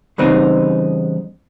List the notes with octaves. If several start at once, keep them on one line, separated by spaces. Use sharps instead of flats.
E2 C#3 G3 B3 C4 D#4